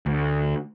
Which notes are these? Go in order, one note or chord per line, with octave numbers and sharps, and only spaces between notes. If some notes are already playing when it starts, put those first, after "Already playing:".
D2